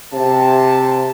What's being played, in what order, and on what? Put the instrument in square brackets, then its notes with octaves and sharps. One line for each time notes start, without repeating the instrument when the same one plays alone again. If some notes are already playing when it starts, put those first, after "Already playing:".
[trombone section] C3 [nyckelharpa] A5